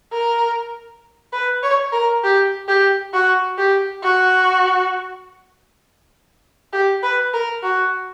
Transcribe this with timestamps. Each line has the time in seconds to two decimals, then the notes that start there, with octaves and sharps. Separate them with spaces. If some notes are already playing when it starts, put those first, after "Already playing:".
0.12 A#4
1.33 B4
1.63 C#5
1.93 A#4
2.24 G4
2.68 G4
3.14 F#4
3.58 G4
4.02 F#4
6.73 G4
7.03 B4
7.33 A#4
7.63 F#4